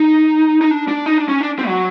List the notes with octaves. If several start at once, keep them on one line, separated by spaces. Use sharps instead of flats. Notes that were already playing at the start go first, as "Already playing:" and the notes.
Already playing: D#4
D#4
D4
D4
D#4
D4
C#4
D4
C4
F#3